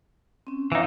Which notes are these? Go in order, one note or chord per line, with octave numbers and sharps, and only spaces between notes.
C4 C#4
E3 D#4 C#5 F5 F#5